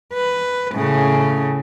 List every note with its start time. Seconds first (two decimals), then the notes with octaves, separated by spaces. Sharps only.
0.14 B4
0.73 A2 C#3